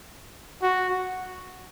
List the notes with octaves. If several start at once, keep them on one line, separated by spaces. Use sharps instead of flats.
F#4